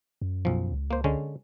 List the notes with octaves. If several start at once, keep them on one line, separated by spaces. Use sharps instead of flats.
F#2
B1 F3
C#2
A#3 C5
D3 G#3 C#4